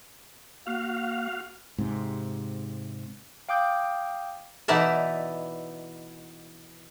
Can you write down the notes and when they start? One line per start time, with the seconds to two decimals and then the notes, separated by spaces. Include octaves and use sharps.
0.67 A#3 F#4 F5
1.78 G#2 C3
3.49 F5 G5 D6 D#6 G6
4.68 B2 E3 D#4 E4 D5 A5